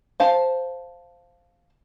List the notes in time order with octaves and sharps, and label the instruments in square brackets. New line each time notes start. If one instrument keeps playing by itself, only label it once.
[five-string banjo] C5 F5 A5